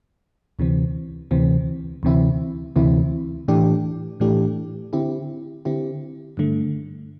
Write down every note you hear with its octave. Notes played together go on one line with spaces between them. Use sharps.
D2 C3 E3 C4
D2 C3 E3 C4
D2 C3 E3 C4 E4
D2 C3 E3 C4 E4
A2 E3 A3 D4 G4
A2 E3 A3 D4 G4
D3 C4 E4 G4
D3 C4 E4 G4
G2 D3 A3